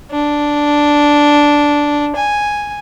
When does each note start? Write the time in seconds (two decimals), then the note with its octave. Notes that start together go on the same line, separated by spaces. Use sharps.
0.12 D4
2.17 G#5